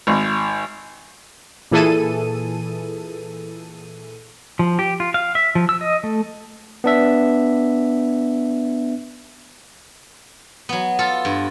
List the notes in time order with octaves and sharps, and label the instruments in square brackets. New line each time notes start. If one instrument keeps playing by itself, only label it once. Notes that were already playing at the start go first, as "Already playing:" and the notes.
[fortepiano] G#1
[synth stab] A#2 E3 G#4 A4 D#7
[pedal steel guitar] F3
G4
F4
F5
E5
F3
E6
D#5
A3
[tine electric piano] B3 D4 E5
[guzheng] F#3 B3
F4 A4
G2